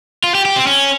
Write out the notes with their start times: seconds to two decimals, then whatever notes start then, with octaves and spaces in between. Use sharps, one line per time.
0.24 F4
0.35 G4
0.45 G4
0.56 C4
0.67 C#4